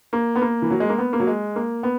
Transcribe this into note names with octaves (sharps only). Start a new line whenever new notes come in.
A#3
B3
A#3
E3
F#3
G#3
A#3
B3
A#3
F#3
G#3
A#3
B3